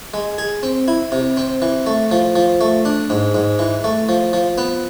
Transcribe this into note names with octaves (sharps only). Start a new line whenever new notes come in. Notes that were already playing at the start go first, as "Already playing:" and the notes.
G#3
G#4
C4
E4
C3
C4
E3
A3
F3
F3
A3
D4
G#2
G#2
E3
A3
F3
F3
B3